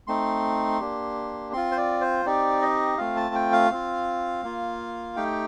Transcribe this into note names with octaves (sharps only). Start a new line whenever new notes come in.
A3 C4 D#4 C6
A#3 D4 G4
C4 F4 C6
C5
D5
C5
C4 D#4 G4 D5
D#5
A3 C4 F4 F5
A5
G5
F5
C4 F4
A#3 F4
A3 D#4 G4 G5